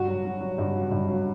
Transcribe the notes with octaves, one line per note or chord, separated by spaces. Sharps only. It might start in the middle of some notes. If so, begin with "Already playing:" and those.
Already playing: G2 F#4
F#3
F#3
F#3
G2
F#3
G2
F#3